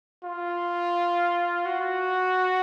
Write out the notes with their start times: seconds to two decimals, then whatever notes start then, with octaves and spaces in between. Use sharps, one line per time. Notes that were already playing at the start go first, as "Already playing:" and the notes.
0.24 F4
1.65 F#4